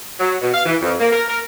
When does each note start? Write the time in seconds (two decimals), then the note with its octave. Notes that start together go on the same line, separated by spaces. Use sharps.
0.20 F#3
0.41 B2
0.54 F5
0.66 E3
0.82 F2
1.00 A#3
1.13 A#4
1.28 A#4